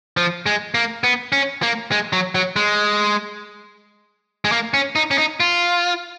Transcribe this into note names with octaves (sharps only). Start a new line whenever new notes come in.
F3
G#3
A#3
B3
C#4
A#3
G#3
F#3
F#3
G#3
G#3
A#3
C#4
D#4
C#4
D#4
F4